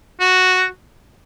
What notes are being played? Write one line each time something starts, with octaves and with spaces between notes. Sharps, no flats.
F#4